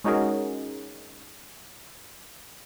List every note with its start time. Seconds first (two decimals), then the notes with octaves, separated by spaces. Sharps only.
0.04 G#3 C#4 D#4 F#4 G#4 A#4